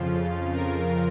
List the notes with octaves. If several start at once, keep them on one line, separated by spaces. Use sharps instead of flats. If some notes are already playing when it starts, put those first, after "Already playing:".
Already playing: F2 C#3 F3 F4
A#4